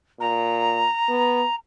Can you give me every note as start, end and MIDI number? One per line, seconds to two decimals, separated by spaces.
0.20 0.85 46
0.20 1.54 82
1.09 1.43 59